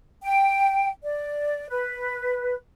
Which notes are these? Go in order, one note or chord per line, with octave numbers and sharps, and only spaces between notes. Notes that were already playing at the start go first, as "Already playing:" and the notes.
G5
D5
B4